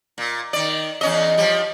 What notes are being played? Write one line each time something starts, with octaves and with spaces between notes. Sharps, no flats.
A#2
D#3 D5
E2 C#4 D#5
F3 G3